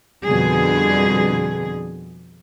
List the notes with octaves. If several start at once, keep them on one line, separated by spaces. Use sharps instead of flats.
F2 B2 D3 G3 G#4